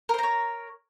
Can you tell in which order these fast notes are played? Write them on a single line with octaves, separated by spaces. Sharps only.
A#4 C5 A#5 C#5